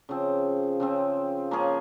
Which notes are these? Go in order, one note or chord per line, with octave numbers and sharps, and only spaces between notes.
C#3 F3 C4
C#3 F3 C4
F3 A#3 C#4 G#4